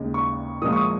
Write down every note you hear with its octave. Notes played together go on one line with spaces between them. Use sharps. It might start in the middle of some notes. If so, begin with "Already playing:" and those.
Already playing: D#2 C#3 G#3
C#6
A#2 F3 G#3 D#6
C#6
D#6